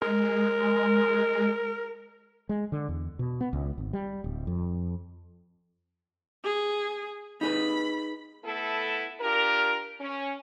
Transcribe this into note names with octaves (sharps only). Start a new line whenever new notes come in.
G#3 A#4
G#3
D3
E2
B2
B3
C#2
G#1
G3
D1
F2
G#4
D#4 G#4 B4 B5
A3 B3 E4 A4
D4 F4 G4 A#4
C#4